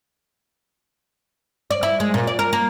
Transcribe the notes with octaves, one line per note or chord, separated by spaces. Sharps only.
D5
E4
G#3
A#2
D5
A#4
A#3